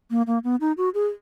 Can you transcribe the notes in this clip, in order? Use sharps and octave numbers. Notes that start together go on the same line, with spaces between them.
A#3
A#3
B3
D#4
F#4
G#4